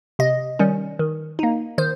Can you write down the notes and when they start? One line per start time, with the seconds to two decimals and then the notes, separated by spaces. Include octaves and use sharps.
0.19 C3 D#5
0.59 D#3 G3 C#4
0.99 D#3
1.39 A#3 D#4
1.78 D#3 C5